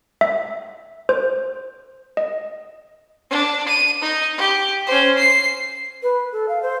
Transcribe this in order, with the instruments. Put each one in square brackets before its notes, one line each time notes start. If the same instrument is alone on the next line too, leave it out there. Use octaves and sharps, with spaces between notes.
[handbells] E5
C5
D#5
[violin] D4
D#7
D#4
G4
C#4 C5
C7
[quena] B4
A4
F5
C5